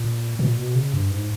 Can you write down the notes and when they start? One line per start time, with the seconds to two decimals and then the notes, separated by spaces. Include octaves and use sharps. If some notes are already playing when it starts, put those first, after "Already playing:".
Already playing: A#2
0.39 A#2
0.57 B2
0.75 C#3
0.93 G2
1.11 G#2